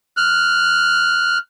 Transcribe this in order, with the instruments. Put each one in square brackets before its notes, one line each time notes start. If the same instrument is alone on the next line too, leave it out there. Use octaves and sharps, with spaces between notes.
[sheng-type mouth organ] F6 F#6